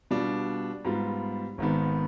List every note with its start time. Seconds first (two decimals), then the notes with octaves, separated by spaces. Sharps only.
0.11 B2 G3 D4 F4
0.85 G#2 G3 B3 F4
1.58 G#1 G#2 D#3 B3